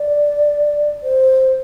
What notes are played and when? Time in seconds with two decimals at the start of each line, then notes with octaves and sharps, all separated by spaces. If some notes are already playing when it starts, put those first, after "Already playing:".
Already playing: D5
1.03 C5